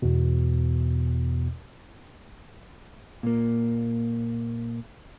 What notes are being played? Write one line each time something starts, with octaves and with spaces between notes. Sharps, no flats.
E2 B2
A#2 A#3